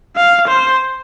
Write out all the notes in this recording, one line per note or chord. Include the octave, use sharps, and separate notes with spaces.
F5
C5